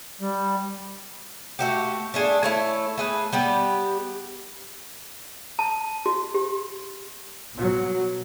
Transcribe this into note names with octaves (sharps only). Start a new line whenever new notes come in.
G3
A3 F#4 G4
A3 D4 G#4
A3 C#4 E4
A3 G#4 B4
G3 B3 G4
A5
F#4
G4
B2 F#3